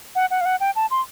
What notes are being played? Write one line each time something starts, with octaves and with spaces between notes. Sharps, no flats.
F#5
F#5
F5
F#5
G5
A5
C6